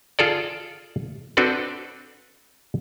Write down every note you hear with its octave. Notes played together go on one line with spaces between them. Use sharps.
F4 G#4 A4 D5
C4 D4 F#4 A4 B4 D5